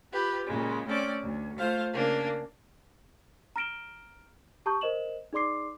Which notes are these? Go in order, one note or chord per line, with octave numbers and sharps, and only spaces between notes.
F4 G4 B4
A#2 C#3 G#3
A3 C4 C#4 D5
D2
A3 F4 C5 F5
C#3 A#3 D4
A#5 F6 A#6 D7 E7 G7
G4 A5 A#5 C#6 D#6 G6
A#4 C5 D#5 E7 F#7
D#4 G#4 D5 C6 D6 C7